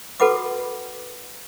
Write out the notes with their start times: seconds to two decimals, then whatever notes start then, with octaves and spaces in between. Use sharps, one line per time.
0.20 F#4 A4 B4 F#5 B5 D6